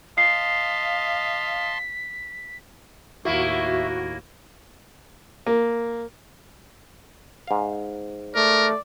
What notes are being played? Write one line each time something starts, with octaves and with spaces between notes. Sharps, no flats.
D#5 F5 A5 C6 B6 C7
D#2 A2 A#3 E4 F#4 E5
A#3
G#2 F5
A3 A#4 D5